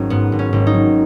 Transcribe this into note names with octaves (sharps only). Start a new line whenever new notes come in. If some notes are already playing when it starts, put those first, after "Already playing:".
Already playing: G#1 F#3 C#4
G#2 B3
G#1
C#4
G#1
D#4
F#3